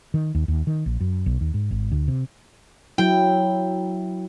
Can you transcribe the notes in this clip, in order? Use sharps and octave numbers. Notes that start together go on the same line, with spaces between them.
D#3
D#2
D#2
D#3
A#1
F#2
B1
D#2
G#2
G#1
D2
C3
F#3 E4 G5